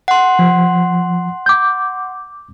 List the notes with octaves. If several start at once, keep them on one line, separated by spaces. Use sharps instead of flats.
F#5 C6
F3
D6 G6